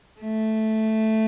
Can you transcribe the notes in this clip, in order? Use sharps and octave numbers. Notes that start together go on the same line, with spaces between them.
A3